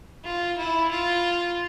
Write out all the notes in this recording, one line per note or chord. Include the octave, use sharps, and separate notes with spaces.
F4
E4
F4